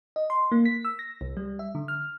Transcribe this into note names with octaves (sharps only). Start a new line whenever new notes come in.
D#5
C6
A#3
B6
E6
A#6
C2
G3
E5
D3
F6